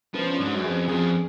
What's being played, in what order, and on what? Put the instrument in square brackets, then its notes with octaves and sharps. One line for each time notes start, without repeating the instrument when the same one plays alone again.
[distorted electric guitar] F3 [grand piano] B3
[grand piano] C#4
D4
[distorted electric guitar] G#2
[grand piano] F#4
[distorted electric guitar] F#2
[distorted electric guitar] F2 [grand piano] G#4
[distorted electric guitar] F2 [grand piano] G#4